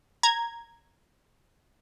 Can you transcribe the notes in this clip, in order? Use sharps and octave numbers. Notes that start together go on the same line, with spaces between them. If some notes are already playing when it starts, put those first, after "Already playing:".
A#5 G#6